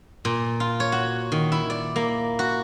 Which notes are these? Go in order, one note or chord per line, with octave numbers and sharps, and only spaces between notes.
A#2
F4
C#5
F#4
D#3
E4
D5
A#3
F#4